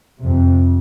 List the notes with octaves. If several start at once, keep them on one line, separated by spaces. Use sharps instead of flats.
F2 C3